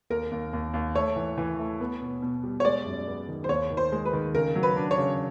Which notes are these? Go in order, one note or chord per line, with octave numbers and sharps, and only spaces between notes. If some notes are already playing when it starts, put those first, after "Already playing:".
D#2 A#4
D#2
D#2
D#2
A3 C#5
E3
E3
A3
B3
B2
B2
G3
C#5
G#3 D5
F#2
B3
D#3
C5
D#2 C#5
D#3
C5
G#3
B4
D#3
C#3 A#4
F#3
B4
D4
C#5
C#3